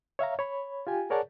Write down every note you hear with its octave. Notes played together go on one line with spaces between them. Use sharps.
C#5 E5 F5 A#5
C#5 B5
F4 G4 G#5
G#4 A#4 C#5 D5 F#5 A5